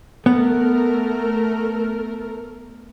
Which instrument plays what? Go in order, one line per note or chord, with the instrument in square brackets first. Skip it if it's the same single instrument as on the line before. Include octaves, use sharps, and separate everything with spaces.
[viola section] A3 A#4 [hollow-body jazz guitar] B3